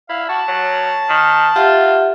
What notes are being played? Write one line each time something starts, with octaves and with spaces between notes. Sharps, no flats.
E4 F5
F#4 A5
F#3
D#3
F4 G4 E5 F#5